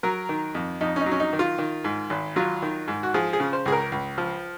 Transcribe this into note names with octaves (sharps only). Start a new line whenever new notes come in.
F#3 A#4
D#3
F2
F2 D#4
C#4
D#4
F#3
C#4
D#4
D#3
F4
D#3
G#2
G#1
F#3 F4
D#3
G#2
F#4
F3 G#4
G#4
C#3
C5
C#2 G#4
A#4
C#2
F3